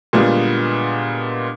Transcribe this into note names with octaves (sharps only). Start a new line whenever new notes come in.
A#2 D3 G3 G#3 B3 F4